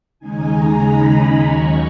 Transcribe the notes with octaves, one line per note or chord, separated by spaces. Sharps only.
D#2 C#3 G#3 D#4 G#5
A#5
B5
D#2 D#3 F#3 C#4 C#6